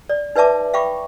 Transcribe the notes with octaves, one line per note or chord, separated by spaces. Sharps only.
D5
D#4 B4 D5 E5 A5 D6
E5 F5 G5 B5 C#6 D6